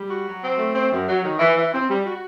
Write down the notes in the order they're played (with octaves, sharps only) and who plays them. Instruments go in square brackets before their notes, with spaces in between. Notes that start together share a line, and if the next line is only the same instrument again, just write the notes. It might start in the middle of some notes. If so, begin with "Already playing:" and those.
Already playing: [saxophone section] G3
F#4
F#3
C4
A3
C4
F#2
F#3
D#3
E3
E3
C4
G3
F#4